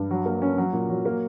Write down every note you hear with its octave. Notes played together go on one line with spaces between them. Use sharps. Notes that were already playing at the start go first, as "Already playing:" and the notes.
Already playing: G2
F#3
A#3
C#4
F#3
A#2
F#3
A#3